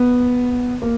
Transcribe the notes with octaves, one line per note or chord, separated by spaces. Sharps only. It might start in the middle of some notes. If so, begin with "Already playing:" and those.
Already playing: B3
A#3